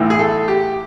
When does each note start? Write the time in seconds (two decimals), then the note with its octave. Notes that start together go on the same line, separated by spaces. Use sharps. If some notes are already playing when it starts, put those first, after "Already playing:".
Already playing: B1 A2 E3
0.10 G#4
0.19 A4
0.48 G4